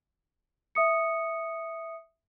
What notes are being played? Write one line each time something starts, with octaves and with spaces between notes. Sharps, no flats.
E5 D#6 C#7